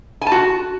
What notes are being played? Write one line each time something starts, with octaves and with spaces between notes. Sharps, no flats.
G#5
A5
F#4